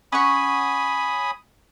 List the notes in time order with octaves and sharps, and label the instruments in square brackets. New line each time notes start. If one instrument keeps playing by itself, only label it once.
[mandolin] C#4 F#5 C#6 [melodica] G#5 B5 D#6